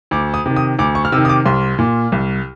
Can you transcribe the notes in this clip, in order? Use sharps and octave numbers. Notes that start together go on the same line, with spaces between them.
D2 D6
D#6
C3 D#3
D#6
D2 D6
C#6
F6
C3 D#3 E6
D#6
D6
C2 C6
A#2
C2